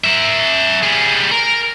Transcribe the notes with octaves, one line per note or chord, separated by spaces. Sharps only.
A#4 E5
G3 G#4
A#4